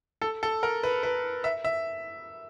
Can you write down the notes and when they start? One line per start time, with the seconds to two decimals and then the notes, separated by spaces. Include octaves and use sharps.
0.22 A4
0.43 A4
0.63 A#4
0.83 B4
1.03 B4
1.44 E5
1.64 E5